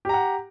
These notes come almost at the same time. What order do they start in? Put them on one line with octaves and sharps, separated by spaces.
G4 A#5 F#5